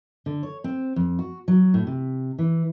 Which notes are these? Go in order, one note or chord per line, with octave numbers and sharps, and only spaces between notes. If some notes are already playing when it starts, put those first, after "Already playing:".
D3
C#5
C4
F2
F#4
F#3
A2
C3
E3